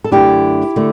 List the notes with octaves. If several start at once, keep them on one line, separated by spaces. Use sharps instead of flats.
A4
F#2 D3 A3 D4 E4 G4
D3 A3